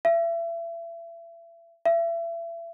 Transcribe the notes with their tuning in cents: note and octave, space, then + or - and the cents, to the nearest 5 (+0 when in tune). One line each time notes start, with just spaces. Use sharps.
E5 +35
E5 +35